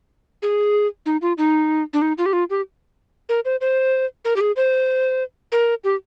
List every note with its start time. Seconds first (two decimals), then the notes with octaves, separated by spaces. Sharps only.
0.42 G#4
1.06 D#4
1.22 F4
1.38 D#4
1.93 D4
2.02 D#4
2.18 F4
2.26 G4
2.33 F4
2.50 G4
3.29 A#4
3.45 C5
3.61 C5
4.25 A#4
4.36 G4
4.41 G#4
4.56 C5
5.52 A#4
5.84 G4